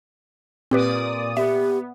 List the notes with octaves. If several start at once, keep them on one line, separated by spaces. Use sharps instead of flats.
A#2 C4 G4 B4 D5 D#6
B3 G4 E5